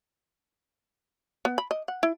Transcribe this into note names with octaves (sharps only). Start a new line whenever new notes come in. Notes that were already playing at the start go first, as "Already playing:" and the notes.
B3
B5
D#5
F#5
E4